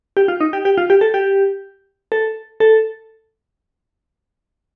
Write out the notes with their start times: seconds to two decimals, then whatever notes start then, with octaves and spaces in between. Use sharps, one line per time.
0.17 G4
0.28 F4
0.40 D#4
0.53 G4
0.65 G4
0.78 F4
0.90 G4
1.01 A4
1.14 G4
2.12 A4
2.60 A4